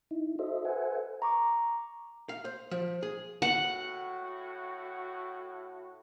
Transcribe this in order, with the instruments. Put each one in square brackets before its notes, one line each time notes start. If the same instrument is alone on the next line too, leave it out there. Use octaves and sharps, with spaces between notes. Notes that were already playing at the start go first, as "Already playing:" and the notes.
[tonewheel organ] D#4 E4
F#4 A4 C5 D#5 E5
A4 B4 C5 E5 F#5 G#5
[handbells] A#5 C#6 D6
[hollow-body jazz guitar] F5
C5
F3
G#4
[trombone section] A2 F#4 [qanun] F#5